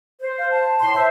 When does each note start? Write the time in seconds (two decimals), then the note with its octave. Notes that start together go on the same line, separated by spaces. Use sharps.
0.22 C5
0.39 F5
0.51 A5
0.82 A2 C6
0.96 C5 E5